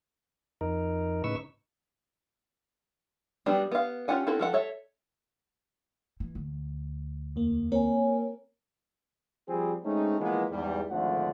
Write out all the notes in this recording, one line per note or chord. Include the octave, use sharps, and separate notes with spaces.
F2 D#4 A#4
A2 C#3 D#4 B4 C#6 E6
F#3 G3 B3 D4 G4
B3 F5
C#4 F4 G4 F#5 G#5
C4 C#4 E4 F#4 A4
F3 A4 F#5
A4 C#5 E5
E3
D2
E2 A#3
A#3 C4 A#4 C#5 G#5
F3 G3 C4 G#4
G#3 A3 C4 C#4 D#4
E3 F3 G#3 A#3 B3
E2 G#2 G3
G#1 D2 D3 F3 A3 F#5